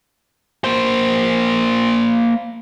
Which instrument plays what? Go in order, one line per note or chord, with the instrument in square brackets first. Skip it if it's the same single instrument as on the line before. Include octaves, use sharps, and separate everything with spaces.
[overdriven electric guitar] A#3 C5